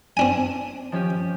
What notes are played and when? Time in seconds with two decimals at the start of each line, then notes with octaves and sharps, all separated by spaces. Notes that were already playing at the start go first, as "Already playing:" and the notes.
0.17 C4 D4 G#5
0.92 F3 C#4 G4